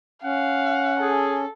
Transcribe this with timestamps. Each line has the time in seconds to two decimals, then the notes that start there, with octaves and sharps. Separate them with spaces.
0.24 C#4 F5 F#5
1.00 G#4 A4